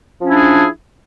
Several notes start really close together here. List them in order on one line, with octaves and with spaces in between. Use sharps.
F3 C#4 E4 D4 G#4